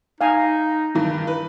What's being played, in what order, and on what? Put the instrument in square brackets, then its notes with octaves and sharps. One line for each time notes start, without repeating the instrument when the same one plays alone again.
[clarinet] D#4 [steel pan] F5 G#5
[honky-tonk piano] G2 D#3 E3
B4